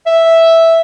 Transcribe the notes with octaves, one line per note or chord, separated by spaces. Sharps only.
E5